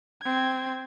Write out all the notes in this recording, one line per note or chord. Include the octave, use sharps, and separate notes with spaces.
C4 G#6